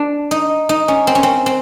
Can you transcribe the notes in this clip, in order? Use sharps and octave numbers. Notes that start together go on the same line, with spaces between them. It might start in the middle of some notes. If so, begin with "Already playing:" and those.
Already playing: D4
D#4
D#4
C#4
C4
C#4
C4
C4